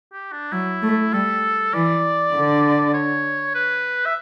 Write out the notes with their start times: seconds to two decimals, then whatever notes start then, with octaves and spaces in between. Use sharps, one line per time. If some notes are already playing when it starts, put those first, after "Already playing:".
0.13 G4
0.32 D4
0.52 F#3 E4
0.82 A3
1.13 G3 A4
1.74 E3 D5
2.34 D3
2.94 C#5
3.55 B4
4.06 E5